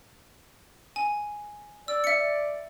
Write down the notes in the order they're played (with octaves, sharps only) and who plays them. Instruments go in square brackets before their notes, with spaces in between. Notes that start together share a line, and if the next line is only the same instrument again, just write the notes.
[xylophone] G#5
[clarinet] D5 [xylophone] E6
[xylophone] E5 C#7